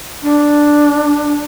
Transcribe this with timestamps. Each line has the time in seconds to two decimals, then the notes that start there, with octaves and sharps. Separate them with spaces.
0.23 D4